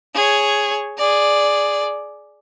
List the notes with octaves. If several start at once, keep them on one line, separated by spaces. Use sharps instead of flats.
G#4 C#5
G#4 D5